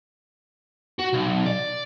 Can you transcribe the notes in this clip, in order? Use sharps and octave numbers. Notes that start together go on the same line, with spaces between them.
F#4
B1
D5